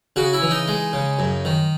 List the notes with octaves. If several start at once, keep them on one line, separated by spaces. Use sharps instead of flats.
C#3 F#4
E4
E3
D#4
G#3
C#3
F#2
D#3